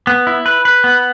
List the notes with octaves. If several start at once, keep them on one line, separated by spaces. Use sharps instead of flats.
B3
E4
B4
B4
B3